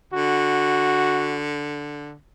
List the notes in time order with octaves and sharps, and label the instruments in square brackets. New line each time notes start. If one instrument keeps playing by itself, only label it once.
[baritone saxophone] D3 [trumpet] F#4